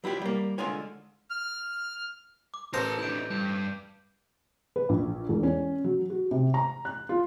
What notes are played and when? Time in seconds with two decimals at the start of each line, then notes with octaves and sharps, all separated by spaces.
0.04 F#3 E4 F4 G4
0.22 G3 A#3
0.58 D3 G#3 F4 F5 G#5
1.30 F6
2.54 D6
2.74 A1 A#4 C5 A5 A#5
2.99 D4 E4 G6 D7
3.30 G2 G6
4.76 B4
4.89 A#1
5.29 E1
5.43 C#4
5.84 F#3
6.10 F#4
6.31 C3
6.54 A#5
6.85 F#6
7.09 F4